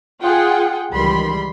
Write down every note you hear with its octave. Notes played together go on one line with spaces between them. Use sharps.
F4 G#4 F#5 G5
C#2 D#3 E3 G3 B5 C6